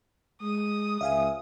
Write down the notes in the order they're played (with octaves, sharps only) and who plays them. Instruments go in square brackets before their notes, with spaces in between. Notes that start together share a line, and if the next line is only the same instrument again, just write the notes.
[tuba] G#3 [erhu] D#6
[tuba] C#2 [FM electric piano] E5 F5 G#5